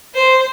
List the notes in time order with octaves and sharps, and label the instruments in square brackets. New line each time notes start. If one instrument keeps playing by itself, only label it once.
[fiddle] C5